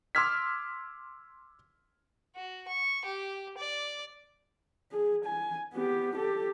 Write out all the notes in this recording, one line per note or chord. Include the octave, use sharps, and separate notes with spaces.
C6 D6 E6 F6 G#6 B6
F#4
C#6
G4
D5
G#4
G#5
B3 G4
G4 A4